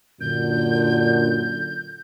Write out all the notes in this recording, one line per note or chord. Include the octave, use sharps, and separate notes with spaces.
F#2 A#2 D3 G6